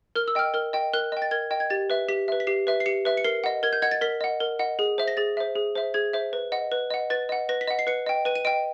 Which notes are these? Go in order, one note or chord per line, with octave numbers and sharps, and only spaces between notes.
A#4 F6
E6
D#5 G5 F6
A#4 F6
D#5 G5
A#4 F#6
D#5 G5
A6
A#4 G#6
D#5 G5
G#6
G4 A6
B4 E5
G4 B6
B4 E5
B6
G4 C7
B4 E5
C7
G4 C#7
B4 E5
C#7
A#4 C7
D#5 F#5
A#4 G#6
G6
D#5 F#5 G#6
A6
A#4 B6
D#5 F#5
A#4
D#5 F#5
G#4
C5 E5
A#6
G#4 A6
C5 E5
G#4
C5 E5
G#4 G#6
C5 E5
B4
D#5 F#5
B4
D#5 F#5
B4 A6
D#5 F#5
B4 A#6
B6
D#5 F#5
C7
B4 C#7
D#5 G5
B4 D#7
D#7
D#5 G5 D7